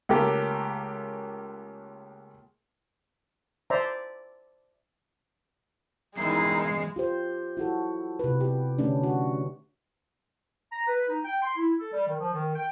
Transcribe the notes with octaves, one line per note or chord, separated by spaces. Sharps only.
C#2 A3 A#3 G4
C5 D5 E5 A#5
E2 G2 D#3 G#3 D#4 E4 C7
F4 G4 C5
E4 F#4 A4
C3 B4
G4
D3 A3 C#4 D4
F#4
A#5
B4
D#4
G5
C6
E4
A4
G3
D#3
F3
D#3
G5